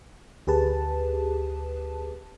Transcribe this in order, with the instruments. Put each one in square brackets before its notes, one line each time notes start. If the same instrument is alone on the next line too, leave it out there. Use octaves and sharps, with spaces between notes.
[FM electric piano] D2 G4 G#4 B4 A5